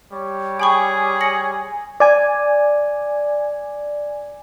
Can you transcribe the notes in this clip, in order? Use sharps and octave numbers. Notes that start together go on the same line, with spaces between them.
G3 C#5
G#4 G5 G#5 B5 C#6
A#6 C#7 F#7
D5 G#5